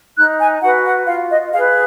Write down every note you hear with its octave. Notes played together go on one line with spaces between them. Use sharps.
D#4 F#6
G#5
F#4 B4 F#5
F#5
F4 F5
D#5
G#4 B4 F5